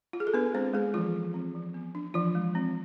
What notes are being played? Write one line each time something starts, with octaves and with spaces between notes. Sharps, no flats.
F4
G#4
A4
B3 D4 B4
G#3 C4 C5
G#3 B3 G#4
E3 F3 F4
G#3
C4
F3
B3
D4
E3 F3 F4
G#3
C4